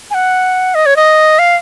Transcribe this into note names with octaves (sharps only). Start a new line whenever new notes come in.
G#5
F#5
D#5
C#5
D#5
F5